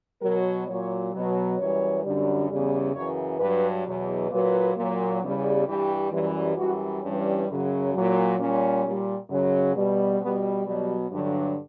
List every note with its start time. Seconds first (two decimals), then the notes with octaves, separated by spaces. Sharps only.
0.22 B2 F#3 A#4
0.66 A#2 F#3 C#5
1.12 B2 F#3
1.57 F#2 E3 G3 C#5
2.03 F#2 D3 G3
2.48 E2 C#3 G3
2.94 F#2 C#3 E3 C#5
3.39 G2 F#3 B4
3.85 E2 B2 F#3
4.30 A#2 F#3 B4
4.76 A#2 F#3
5.22 E2 C#3 G3
5.66 G2 E3 G3 G4
6.11 F#2 E3 G3
6.57 F#2 E3 G3 F#4
7.02 G2 E3 G3 C#4
7.47 F#2 C#3 F#3
7.94 A#2 F#3
8.38 A#2 G3 C#4
8.84 A#2 G3
9.29 F#2 C#3 F#3
9.75 B2 G3
10.20 B2 G3 B3
10.66 B2 F#3 G3
11.11 G2 D3 F#3